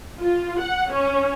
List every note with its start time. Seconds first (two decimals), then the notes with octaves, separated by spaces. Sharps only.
0.21 F4
0.60 F#5
0.92 C#4